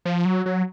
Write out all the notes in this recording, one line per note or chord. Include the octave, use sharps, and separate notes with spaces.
F3
F#3
F#3